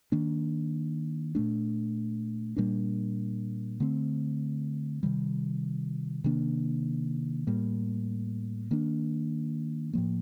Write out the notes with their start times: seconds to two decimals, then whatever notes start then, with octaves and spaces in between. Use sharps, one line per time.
0.12 D#3 A#3 D4
1.35 A#2 A3 D4
2.56 A#2 G3 A#3 D4
3.80 D3 A3 C4
5.03 C3 D#3 G3
6.24 C3 D#3 A#3 D4
7.47 A2 G3 A#3
8.71 D#3 A#3 D4
9.93 A2 F3 A#3